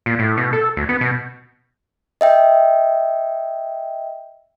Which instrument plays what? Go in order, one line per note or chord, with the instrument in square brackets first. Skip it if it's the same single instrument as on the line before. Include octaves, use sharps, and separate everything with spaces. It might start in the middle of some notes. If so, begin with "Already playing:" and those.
[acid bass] A#2
A2
B2
A4
D2
B3
B2
[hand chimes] D#5 E5 G5